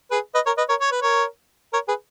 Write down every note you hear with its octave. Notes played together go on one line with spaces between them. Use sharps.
G#4 B4
B4 D#5
A#4 C#5
B4 D#5
A#4 C#5
C#5
B4
A#4 C#5
A#4 C#5
G#4 B4